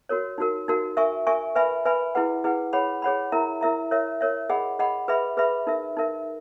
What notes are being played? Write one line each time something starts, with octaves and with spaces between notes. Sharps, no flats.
F#4 A#4 C#5
D#4 F#4 A#4
D#4 F#4 A#4
A#4 E5 G#5 C#6
A#4 E5 G#5 C#6
B4 E5 G#5 B5
B4 E5 G#5 B5
E4 G#4 B4 F#5
E4 G#4 B4 F#5
G#4 C#5 F#5 B5
G#4 C#5 F#5 B5
E4 A#4 E5 A#5
E4 A#4 E5 A#5
A#4 C#5 E5
A#4 C#5 E5
G#4 D#5 F#5 B5
G#4 D#5 F#5 B5
G#4 B4 E5 B5
G#4 B4 E5 B5
D#4 A#4 E5
D#4 A#4 E5